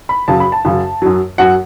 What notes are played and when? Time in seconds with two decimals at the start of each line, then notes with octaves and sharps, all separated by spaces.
0.09 B5
0.28 F#2 C#3 F#3 A5
0.40 B5
0.52 A5
0.65 F#2 C#3 F#3
1.02 F#2 F#3
1.38 F#2 F#3 F#5